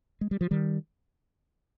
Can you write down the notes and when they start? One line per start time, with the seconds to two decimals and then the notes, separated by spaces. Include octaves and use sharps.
0.21 G#3
0.31 G3
0.41 F3
0.51 D#3 G3